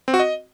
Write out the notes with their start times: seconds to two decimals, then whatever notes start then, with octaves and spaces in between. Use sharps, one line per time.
0.08 C4
0.14 F#4
0.19 D#5